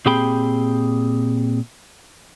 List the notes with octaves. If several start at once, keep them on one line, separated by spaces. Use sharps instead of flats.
A#2 C4 G4 G#4 G5 B5